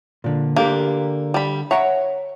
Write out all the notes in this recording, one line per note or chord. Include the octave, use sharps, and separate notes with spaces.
A#2 D3
D3 A#3 G4 A#4
G3 B5
C#5 E5 F#5 A#5